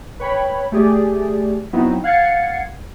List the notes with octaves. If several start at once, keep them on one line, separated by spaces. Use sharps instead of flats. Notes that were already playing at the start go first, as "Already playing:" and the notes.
B4 C#5 G5 B5
A3 G4 G#4 D5
F#3 B3 C4 D#4 E4
F5 F#5 G#6 A6 C7 C#7